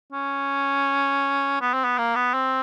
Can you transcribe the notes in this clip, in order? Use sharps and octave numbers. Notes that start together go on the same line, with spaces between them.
C#4
B3
C4
B3
A#3
B3
C4